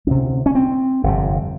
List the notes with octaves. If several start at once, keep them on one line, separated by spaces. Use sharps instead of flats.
D2 C3 C#4
C#4
C4
G1 F2 C3